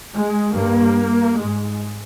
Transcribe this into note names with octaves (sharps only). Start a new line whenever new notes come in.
G#3
G2 A#3
G#2 G#3